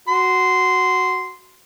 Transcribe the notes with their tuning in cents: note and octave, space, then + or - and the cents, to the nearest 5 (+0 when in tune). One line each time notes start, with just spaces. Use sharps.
F#4 +0 C6 -10